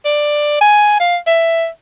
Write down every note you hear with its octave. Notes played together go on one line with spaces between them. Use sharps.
D5
G#5
F5
E5